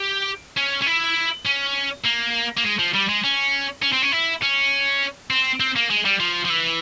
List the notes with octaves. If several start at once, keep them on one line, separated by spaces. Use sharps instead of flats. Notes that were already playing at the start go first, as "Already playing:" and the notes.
Already playing: G4
C#4
C#4
E4
C#4
A#3
A#3
G#3
F3
G3
G#3
C#4
C#4
C4
C#4
E4
C#4
C4
C4
A#3
G#3
G3
F3
F3
E3